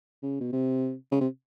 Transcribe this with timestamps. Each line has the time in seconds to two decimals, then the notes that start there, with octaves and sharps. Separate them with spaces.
0.23 C#3
0.41 B2
0.52 C3
1.11 C#3
1.21 C3